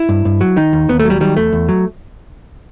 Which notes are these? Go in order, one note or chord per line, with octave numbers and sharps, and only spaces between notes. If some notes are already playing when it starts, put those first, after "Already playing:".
Already playing: E4
G2
G2
F#3
D#3 D#4
D#2
D#2 B3
A3
F#3 G3
D#3 G3
E2 A3
E2
F#3